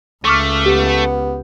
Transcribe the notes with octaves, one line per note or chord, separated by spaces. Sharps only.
C#2 A3 C#6 D6 F6
B3 G4